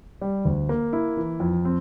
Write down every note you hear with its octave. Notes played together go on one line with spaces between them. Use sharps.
G3
D2
A#3
E4
E3
F2
C4